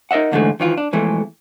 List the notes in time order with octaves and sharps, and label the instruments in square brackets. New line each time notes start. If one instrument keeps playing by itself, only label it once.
[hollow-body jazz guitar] D#4 A#4 D#5 E5 F#5
D2 G#2 D3 E3 G#3 A3
D#3 E3 F4
D4
F2 B2 E3 G#3 A3